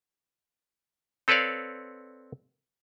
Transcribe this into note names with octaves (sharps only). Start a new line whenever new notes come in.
C4 A4 B4 C#5 D5 F5